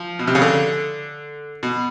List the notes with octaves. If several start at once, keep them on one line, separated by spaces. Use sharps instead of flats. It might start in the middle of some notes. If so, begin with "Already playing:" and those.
Already playing: F3
B2
C3
C#3
D3
B2